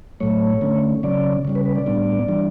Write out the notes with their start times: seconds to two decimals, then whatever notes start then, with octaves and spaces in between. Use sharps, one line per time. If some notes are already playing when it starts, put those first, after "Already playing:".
0.20 A2 F#3 A3 C#5
0.61 D3 A3 C#4
1.03 C#3 F#3 C#4 D5
1.45 C#3 G3 C#4
1.55 B4
1.65 B4
1.76 D5
1.86 A2 G3 B3 D4
2.28 E3 G3 D4